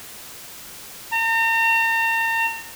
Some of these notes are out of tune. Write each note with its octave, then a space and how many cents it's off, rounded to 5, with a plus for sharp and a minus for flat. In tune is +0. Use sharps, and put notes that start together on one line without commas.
A#5 -40